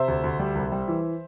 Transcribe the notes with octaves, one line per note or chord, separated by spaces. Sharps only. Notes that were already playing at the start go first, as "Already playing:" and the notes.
Already playing: C3 C5 E5
D2
D2
G3
C2
G3
E3